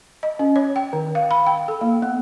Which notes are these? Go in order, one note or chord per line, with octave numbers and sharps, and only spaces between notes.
D#5
C#4
C#5
G5
D#3
F5
B5
G5
A4
A#3
B3